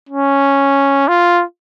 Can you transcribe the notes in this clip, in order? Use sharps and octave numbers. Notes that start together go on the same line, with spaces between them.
C#4
F4